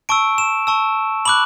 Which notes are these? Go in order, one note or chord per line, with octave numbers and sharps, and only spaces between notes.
A5 C#6 E6 D7
E7
A5 C#6 E6
B5 D6 F#6 F#7